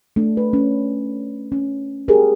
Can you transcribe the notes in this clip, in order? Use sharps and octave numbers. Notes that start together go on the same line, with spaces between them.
A3 D4
B4
C#4
C#4
G4 G#4 A#4